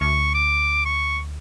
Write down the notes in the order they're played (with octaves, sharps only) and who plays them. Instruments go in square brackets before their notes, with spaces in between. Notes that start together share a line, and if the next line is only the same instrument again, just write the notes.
[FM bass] D2 [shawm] C#6
[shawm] D6
C#6